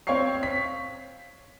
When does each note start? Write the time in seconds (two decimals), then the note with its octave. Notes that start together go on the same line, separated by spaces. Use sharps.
0.07 C4 C#5 F5 G5 C#6 C7
0.43 B6